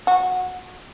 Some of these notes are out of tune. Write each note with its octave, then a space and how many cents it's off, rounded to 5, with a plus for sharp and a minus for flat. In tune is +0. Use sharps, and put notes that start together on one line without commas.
F#4 -15